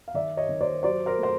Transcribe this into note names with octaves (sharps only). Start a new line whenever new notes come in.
F5
D#3 D5 E5
C#5 D#5
D#3
C5 D5
F#3 C5 D5
A#4 C5
A3 C5